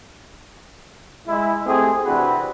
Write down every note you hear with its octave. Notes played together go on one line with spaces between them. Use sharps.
G#3 E4
A3 C4 G4 G#4
C3 E3 C4 D4 F#4 B4